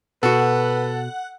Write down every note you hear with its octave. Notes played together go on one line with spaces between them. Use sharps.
B2 F#4 A4 B4 F#5